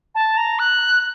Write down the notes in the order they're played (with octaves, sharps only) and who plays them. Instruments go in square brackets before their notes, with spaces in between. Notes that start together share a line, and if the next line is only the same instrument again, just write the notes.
[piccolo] A5
A#5
F#6